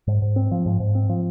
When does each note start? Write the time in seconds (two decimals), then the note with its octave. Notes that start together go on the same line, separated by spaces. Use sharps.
0.07 G#2
0.22 G#2
0.36 C4
0.51 F3
0.66 G#2
0.80 G#2
0.95 C4
1.09 F3